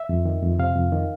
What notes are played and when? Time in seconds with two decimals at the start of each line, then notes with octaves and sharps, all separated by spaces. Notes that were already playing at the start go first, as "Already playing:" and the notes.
Already playing: E5
0.09 F2
0.25 D#3
0.43 F2
0.59 C3 F5
0.76 F2
0.92 D#3